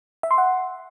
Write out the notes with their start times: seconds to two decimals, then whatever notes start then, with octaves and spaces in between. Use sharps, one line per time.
0.23 E5
0.31 C6
0.38 F#5